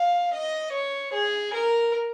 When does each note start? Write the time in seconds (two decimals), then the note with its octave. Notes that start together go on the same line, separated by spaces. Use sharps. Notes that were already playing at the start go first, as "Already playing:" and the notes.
Already playing: F5
0.32 D#5
0.72 C#5
1.12 G#4
1.52 A#4